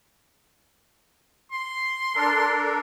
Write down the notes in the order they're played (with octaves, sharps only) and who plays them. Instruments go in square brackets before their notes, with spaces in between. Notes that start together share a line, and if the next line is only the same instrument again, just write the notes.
[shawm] C6
[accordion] D4 A4 A#4